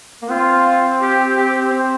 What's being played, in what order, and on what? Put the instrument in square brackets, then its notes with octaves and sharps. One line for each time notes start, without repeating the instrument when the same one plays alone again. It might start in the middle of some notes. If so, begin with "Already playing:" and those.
[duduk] A#3
[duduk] C4 [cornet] F4
[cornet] G4
G4
[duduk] C4